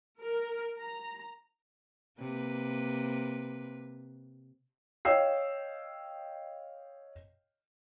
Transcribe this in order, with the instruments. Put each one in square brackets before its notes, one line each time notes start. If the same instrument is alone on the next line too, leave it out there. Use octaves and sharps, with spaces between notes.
[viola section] A#4
A#5
[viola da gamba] C3 A#3 B4
[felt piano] C#5 D#5 F5 G5 E6 C7